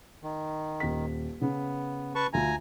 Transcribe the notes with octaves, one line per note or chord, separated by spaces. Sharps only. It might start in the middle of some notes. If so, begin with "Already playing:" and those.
D#3
D#1 B6
C#3 B3
B4 A5 C#6
D2 F4 E5 G#5 A#5